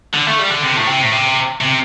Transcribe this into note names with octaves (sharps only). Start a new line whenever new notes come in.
D3
A3
G3
D3
C3
A2
C3
A2
C3
C3